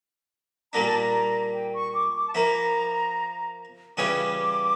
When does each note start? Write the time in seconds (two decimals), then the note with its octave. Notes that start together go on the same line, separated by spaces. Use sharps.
0.73 A#2 G3 A#3 D4 A#5
0.86 A5
0.99 A#5
1.54 G5
1.74 C#6
1.94 D6
2.16 D6
2.28 A5
2.35 F3 A#3 E4 A#5
3.97 C#3 E3 G3 C#4 F4 D6